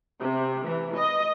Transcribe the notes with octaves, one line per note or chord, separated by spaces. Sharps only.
C3
E3
D#5